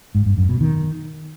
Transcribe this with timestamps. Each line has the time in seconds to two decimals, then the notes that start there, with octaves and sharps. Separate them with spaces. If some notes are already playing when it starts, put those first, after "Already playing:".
0.15 G#2
0.26 G2
0.38 F#2
0.49 B2
0.61 D#3